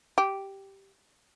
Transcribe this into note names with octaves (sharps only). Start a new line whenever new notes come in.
G4